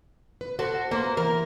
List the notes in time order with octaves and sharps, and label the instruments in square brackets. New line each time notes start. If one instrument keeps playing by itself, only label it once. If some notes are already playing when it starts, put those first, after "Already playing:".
[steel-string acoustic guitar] B4
[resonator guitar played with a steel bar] F#4 [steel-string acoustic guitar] A4 C5
[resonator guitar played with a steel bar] A#3 [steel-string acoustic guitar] B4 C5
[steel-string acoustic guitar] E3 [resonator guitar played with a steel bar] A#4